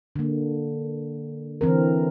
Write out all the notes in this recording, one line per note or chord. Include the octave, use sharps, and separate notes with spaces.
D3 A#3
D3 E3 C4 A#4